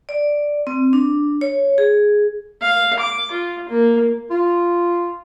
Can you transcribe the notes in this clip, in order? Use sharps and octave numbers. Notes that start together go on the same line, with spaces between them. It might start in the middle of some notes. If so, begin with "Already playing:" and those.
D5
C4
D4
C#5
G#4
F5
D6
F4
A#3
F4